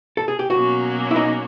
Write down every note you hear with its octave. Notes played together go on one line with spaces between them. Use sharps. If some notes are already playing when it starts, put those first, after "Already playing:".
A4
G#4
G4
B2 F#3 A#3 C#4 F#4
E4
D#4